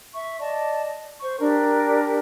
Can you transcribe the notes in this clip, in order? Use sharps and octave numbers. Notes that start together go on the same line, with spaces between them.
E5 C#6
D5 D#5 A5
C5 C#6
D4 G4 A#4